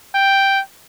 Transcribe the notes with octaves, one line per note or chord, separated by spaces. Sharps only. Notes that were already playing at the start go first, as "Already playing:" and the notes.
G5